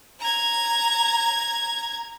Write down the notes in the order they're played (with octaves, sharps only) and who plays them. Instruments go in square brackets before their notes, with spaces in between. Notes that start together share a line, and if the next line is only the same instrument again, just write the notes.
[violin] A#5 G#6